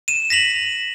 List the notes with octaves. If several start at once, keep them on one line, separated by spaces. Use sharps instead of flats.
D#7 E7
A#6 B6 F7 F#7